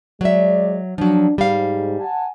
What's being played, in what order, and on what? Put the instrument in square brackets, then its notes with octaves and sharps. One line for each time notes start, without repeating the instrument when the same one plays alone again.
[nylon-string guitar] F#3 E5 [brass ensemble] G#3 D5
[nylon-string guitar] F3 F#3 [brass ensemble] D4
[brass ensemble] G#2 [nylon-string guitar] G3 F5
[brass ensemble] F#5 G#5 A5